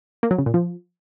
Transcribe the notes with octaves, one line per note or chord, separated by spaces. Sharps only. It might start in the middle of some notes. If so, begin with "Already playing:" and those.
A#3
F#3
C#3
A#2
F3